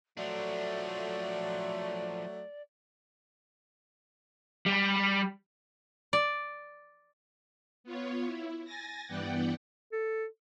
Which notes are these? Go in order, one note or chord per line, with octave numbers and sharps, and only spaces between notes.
F3 F#3 A3 D4 D5
G3
D5
B3 F4 C#5
E4
G#5 A6 A#6
G2 E3 B3 D5 F#5 G5
A4